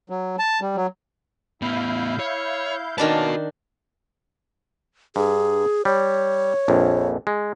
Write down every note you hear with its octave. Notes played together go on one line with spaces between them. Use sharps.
F#3
A5
G3
F#3
A2 B3 E4 F5 G6
C#5
D#3 A#3 C#4 D4 F#4 B4 A5
G2 G#4
G3 C#5
A#1 F2
G#3